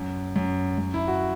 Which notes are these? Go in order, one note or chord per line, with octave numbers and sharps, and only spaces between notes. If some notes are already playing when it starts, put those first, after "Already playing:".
Already playing: F#2
F#2
F#2
E4
F#4